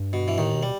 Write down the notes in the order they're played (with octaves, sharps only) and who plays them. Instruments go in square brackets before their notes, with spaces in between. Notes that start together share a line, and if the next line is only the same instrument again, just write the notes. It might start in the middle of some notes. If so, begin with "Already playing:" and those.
Already playing: [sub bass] G2
[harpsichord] B2
E3
[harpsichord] D#2 D#3 [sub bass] A2
[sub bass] B2
[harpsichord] G3